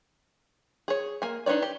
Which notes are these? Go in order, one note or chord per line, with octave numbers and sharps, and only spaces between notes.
G#4 C#5
A#3 G#5
D4 D#4 B4 C#5 D5
G4